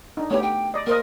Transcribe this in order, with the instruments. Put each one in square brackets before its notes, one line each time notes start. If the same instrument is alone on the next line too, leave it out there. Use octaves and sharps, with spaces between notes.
[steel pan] D4 D#4
[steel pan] A3 B3 G4 [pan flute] C#5
[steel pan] G4 [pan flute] G5
[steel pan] D5 D#5
[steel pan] A#3 C5 D#5 [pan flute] A#4